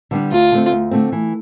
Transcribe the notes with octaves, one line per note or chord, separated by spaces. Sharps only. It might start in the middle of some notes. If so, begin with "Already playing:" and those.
D3 G3 B3 D4
D2 F4
D3 A3 C4
D2
D3 A3 C4
E3